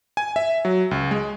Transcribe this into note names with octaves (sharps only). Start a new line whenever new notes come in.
G#5
E5
F#3
C#2
G#3